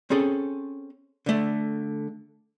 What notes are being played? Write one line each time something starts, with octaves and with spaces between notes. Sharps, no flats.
C4 C#4 G#4 A4
D3 A3